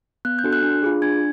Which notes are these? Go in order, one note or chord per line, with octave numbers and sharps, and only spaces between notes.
B3 F#6
G6
D4 F#4 A4
F#6
D4
F4 G#4
D4 G#6